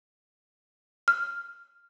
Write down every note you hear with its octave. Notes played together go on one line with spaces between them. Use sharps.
F6